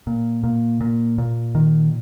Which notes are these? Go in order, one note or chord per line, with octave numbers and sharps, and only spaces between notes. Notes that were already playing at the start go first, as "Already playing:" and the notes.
A#2
A#2
A#2
A#2
D#3